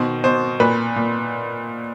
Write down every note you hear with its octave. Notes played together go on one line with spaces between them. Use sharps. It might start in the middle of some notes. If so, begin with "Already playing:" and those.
Already playing: B2 D#3 C5
B2 C5
A#2 B4
A#2